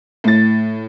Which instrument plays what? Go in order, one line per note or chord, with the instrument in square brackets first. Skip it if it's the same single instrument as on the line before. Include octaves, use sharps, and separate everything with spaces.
[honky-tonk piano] A2 A6